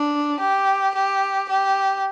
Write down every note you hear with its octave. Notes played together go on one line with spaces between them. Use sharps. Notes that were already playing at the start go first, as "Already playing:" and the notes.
Already playing: D4
G4
G4
G4